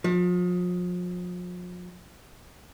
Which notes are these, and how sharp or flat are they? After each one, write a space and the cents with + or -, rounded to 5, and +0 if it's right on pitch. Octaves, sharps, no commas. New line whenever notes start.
F3 +40